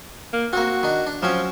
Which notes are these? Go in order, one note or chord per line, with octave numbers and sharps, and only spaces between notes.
A#3
A#3 C4 F#4
D#3 D4
D4
F3 F#3 C4 C#4